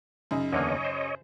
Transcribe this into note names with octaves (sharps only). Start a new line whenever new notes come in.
F#2 C#3 D#4
E2 D3 A#3 C#5 D#5
C5